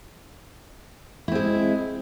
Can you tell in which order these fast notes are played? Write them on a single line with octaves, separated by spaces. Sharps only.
E4 C4 G#3